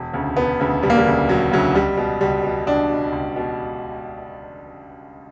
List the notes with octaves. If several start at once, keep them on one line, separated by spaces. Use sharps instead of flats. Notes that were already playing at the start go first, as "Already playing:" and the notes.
Already playing: E1
D2 C#3
E1 B3
D2 C#3
E1 G3
A#3
G3
D2 C#3
E1 F#3
D2 C#3 F#3
C#2 G3
B2
C#2 G3
B2
C#2 D4
B2
C#2
B2